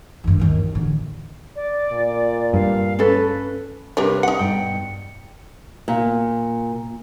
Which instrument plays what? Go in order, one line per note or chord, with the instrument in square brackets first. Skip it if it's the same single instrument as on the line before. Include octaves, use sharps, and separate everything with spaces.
[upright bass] G2 D#3
D#2 D#3
A1 D3
[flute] D5
[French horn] A#2
[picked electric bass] G2 [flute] F5
[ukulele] C#4 A4 [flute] B4
[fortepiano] G2 C3 B4 [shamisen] G4 A#4 C#5
[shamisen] D#4 F#5 [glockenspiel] C#7
[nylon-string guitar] G2 B2 [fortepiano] G5
[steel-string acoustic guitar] A#2